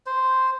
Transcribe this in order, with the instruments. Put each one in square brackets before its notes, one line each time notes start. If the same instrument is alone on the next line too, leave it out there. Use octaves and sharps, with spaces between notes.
[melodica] C5